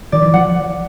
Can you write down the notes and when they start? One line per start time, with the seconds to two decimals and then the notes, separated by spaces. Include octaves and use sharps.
0.12 D#3 D5
0.22 E3
0.34 F3 F#5